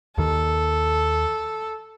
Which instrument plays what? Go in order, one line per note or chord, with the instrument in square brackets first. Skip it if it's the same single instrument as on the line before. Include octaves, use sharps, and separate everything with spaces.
[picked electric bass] D#2 D#3 [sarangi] A4